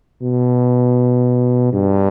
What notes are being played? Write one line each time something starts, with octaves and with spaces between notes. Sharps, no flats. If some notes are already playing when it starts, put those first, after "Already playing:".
B2
G2